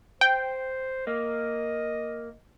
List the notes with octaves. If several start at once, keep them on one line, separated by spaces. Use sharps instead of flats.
C5 G5
A#3 D#5